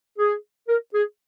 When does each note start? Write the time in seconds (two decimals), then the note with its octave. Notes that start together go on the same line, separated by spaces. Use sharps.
0.18 G#4
0.68 A#4
0.94 G#4